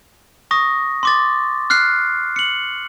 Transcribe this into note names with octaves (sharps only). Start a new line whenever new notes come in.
C#6 D#6 A#6
C6 D6 A6
F6 F#6 C7
C#7 F#7